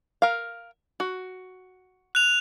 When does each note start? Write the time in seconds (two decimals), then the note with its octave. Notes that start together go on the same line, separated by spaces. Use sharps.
0.22 A#4 F5
1.00 F#4
2.15 F#6 F7